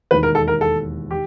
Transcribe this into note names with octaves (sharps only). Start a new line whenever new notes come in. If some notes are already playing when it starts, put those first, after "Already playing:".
E1 D#2 D#3 B4
A#4
A4
A#4
A4
D#3 G4